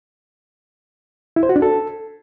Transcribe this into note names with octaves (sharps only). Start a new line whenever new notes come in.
E4
C5
F#4
D4
A4